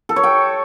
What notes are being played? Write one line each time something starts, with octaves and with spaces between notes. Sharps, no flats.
A4
C#5
G5